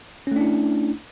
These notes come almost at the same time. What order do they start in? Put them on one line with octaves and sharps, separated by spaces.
C#4 A3 D4 E4